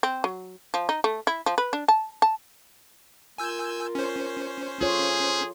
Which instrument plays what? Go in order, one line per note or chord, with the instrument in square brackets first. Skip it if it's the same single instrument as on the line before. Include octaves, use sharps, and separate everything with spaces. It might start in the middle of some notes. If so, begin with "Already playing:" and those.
[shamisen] C4
F#3
F3
D#4
A3
E4
F3
B4
D4
A5
A5
[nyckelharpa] F4 A#4 [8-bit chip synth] G#5 E6 G6
[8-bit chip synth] C#4 C5
[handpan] F4 C#5 [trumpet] G#4 [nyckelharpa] A4 C6